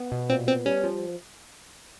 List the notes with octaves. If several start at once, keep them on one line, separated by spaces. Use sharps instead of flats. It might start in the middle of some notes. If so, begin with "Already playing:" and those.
Already playing: B3
B2
A#2 C4
B3 C4
G3 C#4
F3